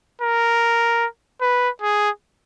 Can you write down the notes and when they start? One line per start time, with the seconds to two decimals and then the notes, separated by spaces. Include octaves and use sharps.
0.21 A#4
1.41 B4
1.82 G#4